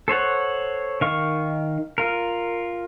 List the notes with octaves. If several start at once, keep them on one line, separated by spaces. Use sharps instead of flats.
A4 C5 C#5 F#5
D#3 F5 C#6
F4 A#4